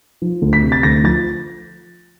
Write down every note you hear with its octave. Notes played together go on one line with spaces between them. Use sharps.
F3
D2
B6
C3
A6
D2 A#6
F3 A6